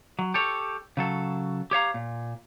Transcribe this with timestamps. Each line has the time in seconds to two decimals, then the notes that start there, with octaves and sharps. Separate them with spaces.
0.19 F#3
0.34 G4 A4 C#5
0.97 C#3 F#3 A4
1.71 G4 C#5 F5 A#5
1.94 A#2